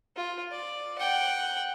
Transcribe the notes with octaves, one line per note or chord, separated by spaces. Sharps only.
F4
D5
F#5 G5